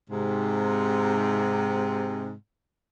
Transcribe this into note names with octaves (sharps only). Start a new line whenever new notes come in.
G#2 C3